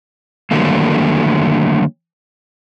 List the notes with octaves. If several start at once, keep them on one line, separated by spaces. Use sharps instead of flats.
D3 D#3 F#3 G3 A3 A#3